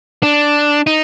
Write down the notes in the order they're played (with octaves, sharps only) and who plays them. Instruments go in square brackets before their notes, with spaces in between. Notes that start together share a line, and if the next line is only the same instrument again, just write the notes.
[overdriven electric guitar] D4
D#4